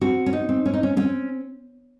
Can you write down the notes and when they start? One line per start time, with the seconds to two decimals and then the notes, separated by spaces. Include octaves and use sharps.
0.01 C4 F#4
0.26 C#4
0.33 D#4
0.49 C4
0.66 C#4
0.74 D#4
0.83 C#4
0.97 C4 C#4